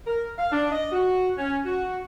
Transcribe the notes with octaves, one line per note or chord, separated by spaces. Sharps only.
A#4
F5
D4
D#5
F#4
C#4
F#4